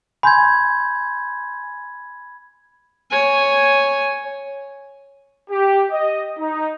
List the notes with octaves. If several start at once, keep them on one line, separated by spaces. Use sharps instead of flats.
G#5 B5 C6 G6 G#6
C#5 G#5
G4
D#5
D#4